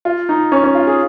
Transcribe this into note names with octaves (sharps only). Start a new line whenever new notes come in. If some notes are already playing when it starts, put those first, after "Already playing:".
F4
D#4
C#4
C#4
F4
G#4